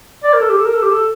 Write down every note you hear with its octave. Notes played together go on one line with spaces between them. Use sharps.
D5
A#4
A4
G4
A4
A#4
A4
G4
A4